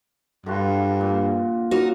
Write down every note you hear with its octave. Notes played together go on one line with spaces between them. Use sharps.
G2 D3 F4 F#4
A#2
A#3 C#4 D#4 F#4 A#4